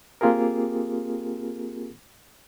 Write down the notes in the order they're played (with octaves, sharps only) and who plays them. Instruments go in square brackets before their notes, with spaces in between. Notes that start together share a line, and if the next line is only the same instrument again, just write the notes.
[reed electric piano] A#3 C4 F4 G4 G#4 A#4